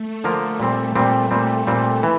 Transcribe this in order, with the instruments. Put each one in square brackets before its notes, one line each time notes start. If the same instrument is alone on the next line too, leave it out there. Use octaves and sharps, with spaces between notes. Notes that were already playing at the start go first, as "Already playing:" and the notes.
Already playing: [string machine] A3
[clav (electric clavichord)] D3 F3 A#3 F4 A#4
A#2 G3 C4
A#2 G3 C4
A#2 G3 C4
A#2 G3 C4
E3